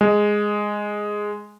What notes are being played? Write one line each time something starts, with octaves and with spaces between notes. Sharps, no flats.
G#3